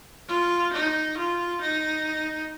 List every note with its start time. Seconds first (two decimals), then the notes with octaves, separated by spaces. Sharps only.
0.29 F4
0.73 D#4
1.17 F4
1.61 D#4